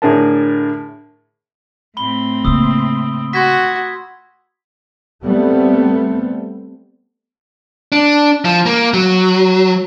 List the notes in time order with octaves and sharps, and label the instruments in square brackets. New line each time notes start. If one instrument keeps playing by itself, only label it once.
[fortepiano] A2 D3 G#4 A#4 A5
[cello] A2 C4 [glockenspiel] B5 G7
[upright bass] C#3 A#3 [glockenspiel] D#6 E6
[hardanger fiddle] F#4 [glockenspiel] C6 G#6 B6
[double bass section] G3 A3 B3 C4
[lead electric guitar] D4
F3
A#3
F#3